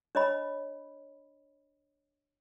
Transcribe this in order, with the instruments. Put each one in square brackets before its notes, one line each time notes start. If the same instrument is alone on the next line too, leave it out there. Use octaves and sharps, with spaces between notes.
[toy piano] D4 C#5 D#5 B5